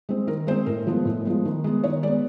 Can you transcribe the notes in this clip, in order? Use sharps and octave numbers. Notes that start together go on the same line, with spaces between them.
G#3 C4
D#3 A#4
G#3 C4 C5
A2 A#4
F3 G#3 B3
A2
F3 G#3 B3
D#3
G#3 B3
D#3 C#5
G#3 B3 D5